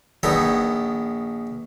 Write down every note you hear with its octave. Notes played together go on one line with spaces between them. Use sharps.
A#1 D#3 B3 D#4 A4 C#5